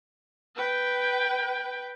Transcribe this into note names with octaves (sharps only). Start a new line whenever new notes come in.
B4 G5